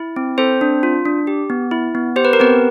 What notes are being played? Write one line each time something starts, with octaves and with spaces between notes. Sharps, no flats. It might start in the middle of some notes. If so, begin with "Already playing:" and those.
Already playing: E4
C4
C4 A4 C5
D4
F4
D4
G4
B3
E4
B3
G4 C5
B4
A#4
B3 C4 B4